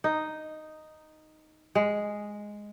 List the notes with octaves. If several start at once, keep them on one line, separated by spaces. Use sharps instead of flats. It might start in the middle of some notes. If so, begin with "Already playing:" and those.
D#4
G#3